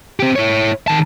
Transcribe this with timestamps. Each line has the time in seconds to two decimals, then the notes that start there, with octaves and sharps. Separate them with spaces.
0.20 C4 G4
0.36 E4 C#5
0.88 D#3 A5